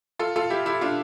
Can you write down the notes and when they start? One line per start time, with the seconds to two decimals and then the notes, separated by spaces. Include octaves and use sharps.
0.19 F4 A4
0.36 F4 A4
0.50 E4 G4
0.66 E4 G4
0.81 D4 F4